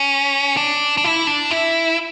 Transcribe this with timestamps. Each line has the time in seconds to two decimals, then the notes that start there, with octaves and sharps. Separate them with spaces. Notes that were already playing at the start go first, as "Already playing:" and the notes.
Already playing: C#4
0.57 D4
0.97 D4
1.04 E4
1.27 D4
1.51 E4